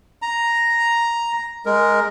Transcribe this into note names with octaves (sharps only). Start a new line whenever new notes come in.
A#5
G#3 A#4